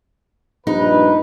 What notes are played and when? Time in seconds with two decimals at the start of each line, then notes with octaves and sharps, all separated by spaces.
0.67 A#1 G2 D#4 B4